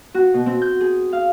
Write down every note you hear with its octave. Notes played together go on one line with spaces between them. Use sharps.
F#4
B2
C4
G6
G#4
F5